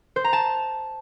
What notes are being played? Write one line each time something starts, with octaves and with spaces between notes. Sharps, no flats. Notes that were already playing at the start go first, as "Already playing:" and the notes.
C5
A#5
A5